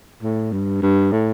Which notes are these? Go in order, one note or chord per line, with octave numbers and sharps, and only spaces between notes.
A2
G2
G2
A2